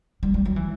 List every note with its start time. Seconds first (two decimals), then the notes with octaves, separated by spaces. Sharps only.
0.23 G3
0.34 G3
0.45 F#3
0.56 E3